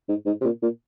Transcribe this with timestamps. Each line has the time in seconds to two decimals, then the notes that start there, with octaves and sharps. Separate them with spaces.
0.09 G#2
0.26 G#2
0.41 C3
0.45 A#2
0.62 A#2